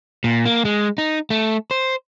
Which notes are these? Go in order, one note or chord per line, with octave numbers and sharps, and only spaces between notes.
A#2
A#3
G#3
D#4
A3
C5